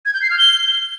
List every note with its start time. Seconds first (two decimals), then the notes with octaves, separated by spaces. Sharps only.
0.06 G#6
0.14 G6
0.22 C7
0.30 F6
0.38 G7